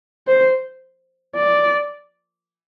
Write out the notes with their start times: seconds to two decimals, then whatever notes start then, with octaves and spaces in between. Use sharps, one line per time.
0.28 C5
1.36 D5